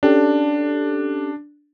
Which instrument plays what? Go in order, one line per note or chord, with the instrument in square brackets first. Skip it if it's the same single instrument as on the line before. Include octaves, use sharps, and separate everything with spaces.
[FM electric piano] C#4 G4 A4 [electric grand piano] D4